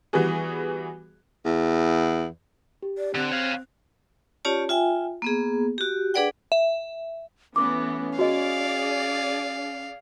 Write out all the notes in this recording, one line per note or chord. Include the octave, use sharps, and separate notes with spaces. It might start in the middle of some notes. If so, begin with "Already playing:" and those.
E3 G3 B3 F#4 G#4
E2
G4
D5
D3 C4 F#6
C#5 F5
C#4 F4 G4 C#5 D5 A5
F4 E5 G5 G#5
A#3 B3 G#4
F#4 G4
D4 G#4 B4 D5 F#5 G5
E5
E3 A3 B3 C#4 D6
F#4 G#4 D5 D#5 F5